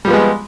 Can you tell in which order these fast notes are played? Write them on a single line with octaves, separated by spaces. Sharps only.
G3 F3 B3 G#3